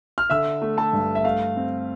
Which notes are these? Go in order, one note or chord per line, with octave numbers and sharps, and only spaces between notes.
F6
D3 E5 E6
A3
A4 A5
G2
E5
A3 F5
C4